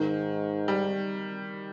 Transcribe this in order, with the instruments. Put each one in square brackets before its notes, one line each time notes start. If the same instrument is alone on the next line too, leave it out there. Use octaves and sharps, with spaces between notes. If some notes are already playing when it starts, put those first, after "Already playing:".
Already playing: [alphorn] G#2 [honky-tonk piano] D#3
[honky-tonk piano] G3